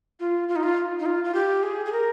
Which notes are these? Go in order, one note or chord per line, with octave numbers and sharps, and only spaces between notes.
F4
F4
D#4
F4
D#4
F4
F4
G4
G#4
G#4
A#4